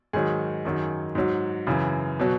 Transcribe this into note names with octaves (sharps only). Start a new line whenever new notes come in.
G#2 D#3 F#3 G#4
F#2 D#3 F#3
G#2 F#3
F#2 C#3 E3
B2 F#3